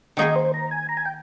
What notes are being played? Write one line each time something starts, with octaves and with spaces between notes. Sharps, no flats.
D#3 A#3 D#4 G#4 D#5
C5
A#5
G#5
A#5
G#5
G5